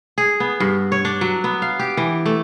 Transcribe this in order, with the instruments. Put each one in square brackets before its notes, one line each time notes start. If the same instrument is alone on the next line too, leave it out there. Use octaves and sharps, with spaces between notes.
[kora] G#4
B3
G2
C#5
D4
F#3
B3
F5
G4
E3
A3